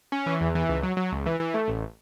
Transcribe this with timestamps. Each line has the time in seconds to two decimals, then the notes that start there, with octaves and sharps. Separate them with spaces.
0.12 C#4
0.26 E3
0.41 E2
0.55 E3
0.69 C#2
0.83 F#3
0.97 F#3
1.12 C#2
1.26 E3
1.40 E3
1.54 A3
1.68 A1